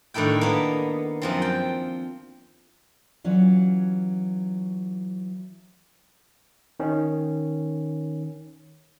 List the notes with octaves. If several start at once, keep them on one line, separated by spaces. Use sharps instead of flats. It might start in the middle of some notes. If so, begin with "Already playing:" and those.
A2 D#3 D4 E4 G5
A#3 B3
F#2 F3 C4
G5
E3 F#3 C#4 F4
D#3 C#4